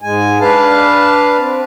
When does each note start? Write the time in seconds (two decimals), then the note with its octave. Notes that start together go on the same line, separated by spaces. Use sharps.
0.01 G#2 G#3 G#5
0.41 D4 B4 F5 A5
1.38 C4